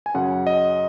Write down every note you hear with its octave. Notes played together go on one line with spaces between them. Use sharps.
G#5
F#2 C#3 F#5
D#5